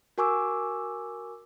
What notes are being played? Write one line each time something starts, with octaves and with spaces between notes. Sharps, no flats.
F#4 A#4 G#5 C#6 D6 E6